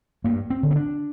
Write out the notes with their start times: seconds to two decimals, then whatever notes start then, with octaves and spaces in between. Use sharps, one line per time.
0.24 G2 A#3
0.50 C4
0.63 D3
0.71 C4
0.76 D4